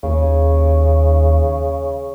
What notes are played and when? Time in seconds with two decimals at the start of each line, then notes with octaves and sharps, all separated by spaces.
0.03 D#2 C#3